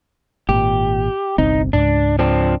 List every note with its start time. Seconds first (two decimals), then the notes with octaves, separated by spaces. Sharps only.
0.49 G#1 A#2 G4
1.38 G1 C2 C4 D#4
1.73 C#2 G#2 D4
2.19 F3 C4 D4